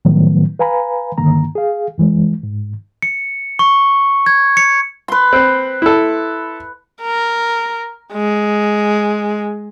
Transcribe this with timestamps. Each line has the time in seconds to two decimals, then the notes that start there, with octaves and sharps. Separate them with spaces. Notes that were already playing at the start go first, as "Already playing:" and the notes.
0.05 A2 D#3 F3 F#3 A3 B3
0.59 B4 F5 G#5 A#5 B5
1.18 G2 D3 D#3 A#3 A#5
1.55 G#4 F5
1.98 F#2 E3 G#3
2.43 G#2
3.02 C#7
3.59 C#6
4.26 G#6
4.57 C#7
5.08 B4 C6
5.33 C4
5.82 E4 A4
7.02 A#4
8.13 G#3